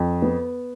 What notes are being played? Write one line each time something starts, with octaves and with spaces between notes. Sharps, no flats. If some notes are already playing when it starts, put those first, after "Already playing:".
Already playing: F2
B3